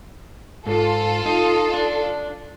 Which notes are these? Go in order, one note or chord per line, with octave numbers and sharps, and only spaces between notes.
G#2 F4 A4
D#4
D4